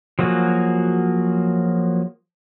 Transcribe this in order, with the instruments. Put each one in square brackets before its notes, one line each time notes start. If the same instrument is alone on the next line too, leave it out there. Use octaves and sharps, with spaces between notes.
[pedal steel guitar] F3 F#3 A#3 F#4 G#4